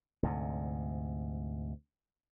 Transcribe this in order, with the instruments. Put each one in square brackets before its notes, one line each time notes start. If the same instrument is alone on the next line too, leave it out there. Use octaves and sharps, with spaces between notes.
[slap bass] D2 G#2 C3